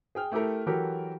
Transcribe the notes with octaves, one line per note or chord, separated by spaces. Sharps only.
G#4 G5 F6
A3 E4 G4 A4 A#4
E3 F#3 F#4 G4 A4 A#4